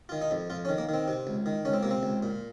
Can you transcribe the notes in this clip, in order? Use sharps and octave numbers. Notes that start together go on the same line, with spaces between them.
D#3 F4
D#4
F2
F2 F4
C#4
D#3
A#3
D#3 C4
C3
C#2
D#3
C#2 C#4
C4
C3 A#3
C4
C#2
A#2